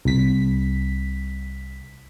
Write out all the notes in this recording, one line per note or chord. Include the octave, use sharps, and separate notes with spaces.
C2 B6